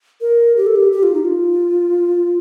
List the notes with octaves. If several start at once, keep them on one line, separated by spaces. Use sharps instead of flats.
A#4
G4
A4
G4
G4
F4
D#4
F4